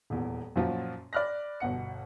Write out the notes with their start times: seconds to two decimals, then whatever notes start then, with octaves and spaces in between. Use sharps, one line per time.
0.10 D#1 E2
0.56 F#2 A#2 F3 F4 F#4
1.13 D5 B5 F6 F#6 A#6
1.60 G1 B2 F#5 C#7